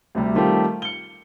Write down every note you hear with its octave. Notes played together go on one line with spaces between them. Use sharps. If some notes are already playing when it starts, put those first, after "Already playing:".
D2 C3 G3
D#3 G3 A3 C4 F4 G4
C#7 G7